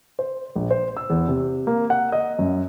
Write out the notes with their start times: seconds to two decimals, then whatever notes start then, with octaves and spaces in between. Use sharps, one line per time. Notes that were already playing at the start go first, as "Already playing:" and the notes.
0.19 C5
0.56 A#1
0.71 C5
0.97 E6
1.10 E2
1.28 C3
1.67 A#3
1.90 F#5
2.12 D#5
2.39 F#2